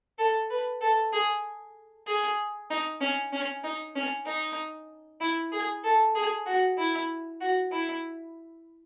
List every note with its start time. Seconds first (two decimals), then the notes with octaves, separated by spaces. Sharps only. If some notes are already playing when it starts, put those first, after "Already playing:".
0.18 A4
0.50 B4
0.81 A4
1.13 G#4
2.07 G#4
2.70 D#4
3.01 C#4
3.33 C#4
3.63 D#4
3.95 C#4
4.26 D#4
5.21 E4
5.52 G#4
5.84 A4
6.15 G#4
6.46 F#4
6.78 E4
7.41 F#4
7.72 E4